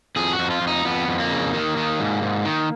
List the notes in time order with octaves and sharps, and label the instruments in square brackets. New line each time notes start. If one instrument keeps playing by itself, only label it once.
[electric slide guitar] F2 G#4
F#4
F2
F4
F2
D#4
F2 B3
F2
A#3
C#3
D#3
D#3
G#2
G#2
D#3